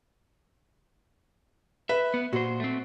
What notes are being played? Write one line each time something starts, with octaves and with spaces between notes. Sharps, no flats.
B4 E5
B3
A#2 F#4 C5
A3 C4